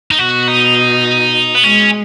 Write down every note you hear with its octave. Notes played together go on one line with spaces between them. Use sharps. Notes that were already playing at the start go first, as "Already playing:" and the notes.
D#4
B2 F#4
D#4
B3
G#3 C#4